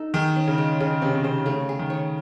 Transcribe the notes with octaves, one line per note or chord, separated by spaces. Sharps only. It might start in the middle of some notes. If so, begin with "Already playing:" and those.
Already playing: D#4 A4
D#3 G#4
C#4
C#3
G#3
C#3 G#3
C3 C#4
C3
C#3 C5
C#3 A3
G#4
D#3
C#5